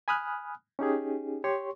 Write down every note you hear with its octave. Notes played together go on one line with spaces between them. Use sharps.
G#5 B5 D#6 F6 F#6
C#4 D#4 G4 G#4
G4 C#5 C6 C#6